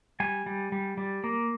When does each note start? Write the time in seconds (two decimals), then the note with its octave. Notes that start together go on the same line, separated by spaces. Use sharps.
0.20 G3 G#5
0.46 G3
0.72 G3
0.98 G3
1.24 A#3